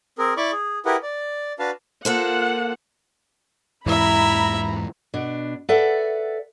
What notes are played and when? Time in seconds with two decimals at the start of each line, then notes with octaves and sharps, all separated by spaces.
0.18 C4 G#4 A#4
0.37 E4 D5 B5 C#6 D6
0.52 G#4
0.85 E4 G4 G#4 A#4 B4 F#5
1.03 D5
1.59 D4 F#4 B4 F5 A5
2.05 A#3 F4 A4 C5 F#5
3.86 E2 G#2 E3 E4 E5 A#5 B5
5.14 B2 D4
5.69 A4 B4 D5 E5 F#5